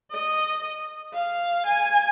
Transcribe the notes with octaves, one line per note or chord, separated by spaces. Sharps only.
D#5
F5
G#5